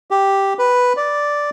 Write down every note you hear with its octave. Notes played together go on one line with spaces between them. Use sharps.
G4
B4
D5